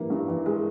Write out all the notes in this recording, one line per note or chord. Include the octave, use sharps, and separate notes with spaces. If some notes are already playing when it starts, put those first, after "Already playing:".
Already playing: G2 E3 A#3
G2
E3
G#3